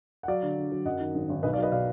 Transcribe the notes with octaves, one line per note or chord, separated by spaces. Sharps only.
F#5
F#3 D5 F5
D3
D3
F#3
F#2 D#5 F#5
D#3
G#1
G#1
B1 B4 D#5
D5 F5
F#3 B4 D#5
B2 D5 F5